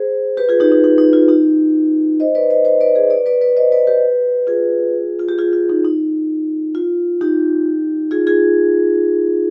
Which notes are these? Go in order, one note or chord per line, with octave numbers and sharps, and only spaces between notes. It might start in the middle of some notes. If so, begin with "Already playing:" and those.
Already playing: G#4 C5
G4 B4
F4 G#4
D#4 G4
D#4
D#4
D#4
F4
D#4 G4
C5 D#5
B4 D5
C5 D#5
C5 D#5
B4 D5
G#4 C5
B4 D5
B4 D5
B4 D5
C5 D#5
B4 D5
G4 B4
F4 G#4
F4
G4
F4 G#4
F4
D#4
D#4
F4
D#4 G4
F4 G#4
F4 G#4